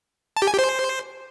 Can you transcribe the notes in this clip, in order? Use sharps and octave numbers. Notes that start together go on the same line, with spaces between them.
A5
G4
G#5
G4
C5